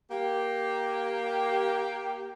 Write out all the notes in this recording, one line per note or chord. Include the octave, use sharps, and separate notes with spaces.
A#3 G4